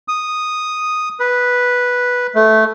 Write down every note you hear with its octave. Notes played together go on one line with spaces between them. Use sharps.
D#6
B4
A3